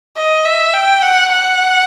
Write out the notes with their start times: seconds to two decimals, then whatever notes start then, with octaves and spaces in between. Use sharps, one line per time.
0.17 D#5
0.45 E5
0.74 G5
1.03 F#5
1.31 F#5